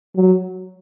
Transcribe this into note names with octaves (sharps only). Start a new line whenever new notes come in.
F#3